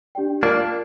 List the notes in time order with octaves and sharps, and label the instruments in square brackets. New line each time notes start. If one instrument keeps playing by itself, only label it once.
[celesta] D4 G4 D5 G5
[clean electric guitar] A#3 D4 [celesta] F4 A#4 D5